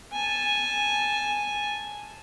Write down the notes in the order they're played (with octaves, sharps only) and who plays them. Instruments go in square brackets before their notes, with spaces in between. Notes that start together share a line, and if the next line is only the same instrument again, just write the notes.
[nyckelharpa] G#5 A5